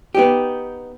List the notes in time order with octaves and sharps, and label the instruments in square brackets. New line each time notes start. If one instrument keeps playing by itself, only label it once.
[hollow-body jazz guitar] B3 D#4 G4